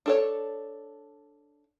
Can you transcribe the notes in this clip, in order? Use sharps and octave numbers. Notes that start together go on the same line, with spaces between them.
D4 A4 C#5